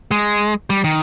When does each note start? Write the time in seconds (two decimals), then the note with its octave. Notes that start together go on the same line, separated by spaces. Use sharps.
0.11 G#3
0.70 G3
0.84 D#3